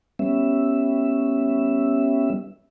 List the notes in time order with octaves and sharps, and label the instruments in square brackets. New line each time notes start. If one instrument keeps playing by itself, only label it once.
[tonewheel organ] G3 B3 C#4 E5